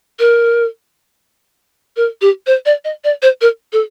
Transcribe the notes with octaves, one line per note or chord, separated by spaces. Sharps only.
A#4
A#4
G4
C5
D5
D#5
D5
C5
A#4
A4